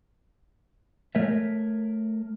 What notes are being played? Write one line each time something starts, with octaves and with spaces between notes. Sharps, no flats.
A3 A#4 C#5 E5